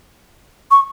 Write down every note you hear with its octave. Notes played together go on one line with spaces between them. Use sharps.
C#6